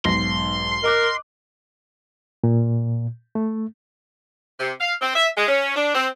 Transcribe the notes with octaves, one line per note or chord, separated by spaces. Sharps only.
B1 G#2 C6 A#6
A#4 D#5 D6 F#6
A#2
A3
C3
F5
C4
E5
G#3
C#4
D4
C4